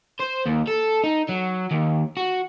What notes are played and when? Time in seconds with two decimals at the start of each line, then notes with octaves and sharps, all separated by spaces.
0.20 C5
0.46 D#2
0.68 A4
1.04 D#4
1.29 F#3
1.71 D#2
2.17 F#4